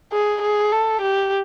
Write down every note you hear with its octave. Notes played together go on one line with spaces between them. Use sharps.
G#4
G#4
A4
G4